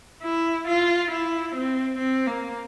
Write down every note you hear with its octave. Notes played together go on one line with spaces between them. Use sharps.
E4
F4
E4
C4
C4
A#3